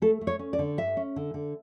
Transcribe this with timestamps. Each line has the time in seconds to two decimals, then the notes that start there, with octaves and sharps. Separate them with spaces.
0.02 A3 A4
0.21 A3
0.27 C#5
0.39 C#4
0.53 D5
0.59 D3
0.77 G2 E5
0.97 C#4
1.16 D3
1.34 D3